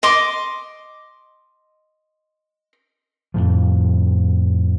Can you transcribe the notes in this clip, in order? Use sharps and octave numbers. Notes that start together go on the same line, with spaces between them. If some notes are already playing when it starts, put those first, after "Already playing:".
D#5 C6 D6
F2 A2 F3